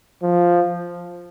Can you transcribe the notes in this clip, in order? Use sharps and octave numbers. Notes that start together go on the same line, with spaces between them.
F3